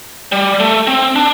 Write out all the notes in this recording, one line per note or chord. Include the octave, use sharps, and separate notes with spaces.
G3
A3
C4
D4